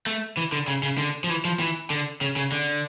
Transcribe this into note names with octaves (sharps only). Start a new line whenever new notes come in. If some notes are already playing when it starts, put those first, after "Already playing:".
A3
E3
D3
C#3
C#3
D3
F3
E3
F3
E3
D3
C#3
C#3
D3